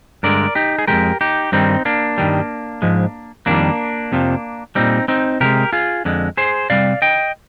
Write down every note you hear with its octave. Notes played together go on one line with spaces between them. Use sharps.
G2 D3 G#3 A#4 D5
D#4 G4
G#4
F2 D#3 G#3 G4 A#4
D#4 G4
G2 D#3 G3 C4 D#4
A#3 D4
G2 D#3 G3
G#2 F3 G#3
F2 C3 D#3 G3 A#3 D4
F2 C3 F3
A#2 G3 C4 D#4
C4 D#4
C3 F3 G#3 G4 A#4
F4 G#4
F2 D3 G#3
G#4 C5
C3 G3 D5 F5
D#5 G5